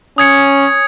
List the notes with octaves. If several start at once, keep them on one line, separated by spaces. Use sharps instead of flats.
C#4 D#6 G#6 C#7